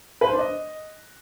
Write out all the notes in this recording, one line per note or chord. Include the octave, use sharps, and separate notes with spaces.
B4
C5
D4
D#5